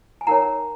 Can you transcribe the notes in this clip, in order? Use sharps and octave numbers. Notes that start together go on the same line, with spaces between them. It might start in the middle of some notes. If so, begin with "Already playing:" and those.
G#5
D#4 A#4 C#5 F#5 A#5